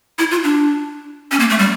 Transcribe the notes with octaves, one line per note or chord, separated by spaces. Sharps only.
E4
F4
D4
C#4
A#3
A3
G3